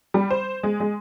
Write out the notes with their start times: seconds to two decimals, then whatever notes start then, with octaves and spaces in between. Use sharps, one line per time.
0.14 G3
0.31 C5
0.63 G#3
0.80 G#3